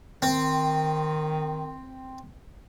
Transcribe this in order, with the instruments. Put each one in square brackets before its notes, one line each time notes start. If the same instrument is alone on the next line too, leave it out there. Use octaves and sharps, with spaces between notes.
[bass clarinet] D#3 [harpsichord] C4